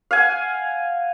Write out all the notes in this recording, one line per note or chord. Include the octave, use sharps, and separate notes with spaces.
F5 F#5 G#5